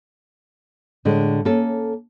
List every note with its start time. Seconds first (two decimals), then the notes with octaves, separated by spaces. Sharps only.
1.05 A2 D3 G#3
1.45 A#3 C#4 A4